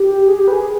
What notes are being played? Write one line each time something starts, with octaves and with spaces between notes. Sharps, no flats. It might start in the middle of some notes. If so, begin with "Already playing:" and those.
Already playing: G4
G#4
G4
B4
G#4